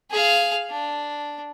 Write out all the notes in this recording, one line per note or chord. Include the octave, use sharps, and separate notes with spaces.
G#4 F5
D4